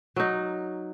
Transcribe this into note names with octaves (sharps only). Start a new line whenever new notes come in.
F#3 D#4